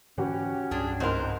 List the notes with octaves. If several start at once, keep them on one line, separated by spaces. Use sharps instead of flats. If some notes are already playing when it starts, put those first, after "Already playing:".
G#2 D3 E3 C#4 F#4 G4 F#5
C2 G2 F#3 D4 G#4
C#2 G#2 C4 A#4